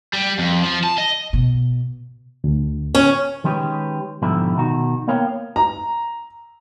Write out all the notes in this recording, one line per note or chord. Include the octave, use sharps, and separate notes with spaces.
G3
F2
F3
A5
D#5
B2
D2
C#4
D#3 G#3 C#4 G4 B4 C#5
G#2 B2 D3 F3 G3 E4
B2 D#3 F#4
A#3 B3 A#4 C#5 F5 G5
A#5